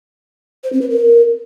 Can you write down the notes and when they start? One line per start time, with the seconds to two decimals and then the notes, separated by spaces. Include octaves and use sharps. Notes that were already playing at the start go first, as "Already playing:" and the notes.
0.64 C5
0.73 C4
0.81 B4
0.90 A#4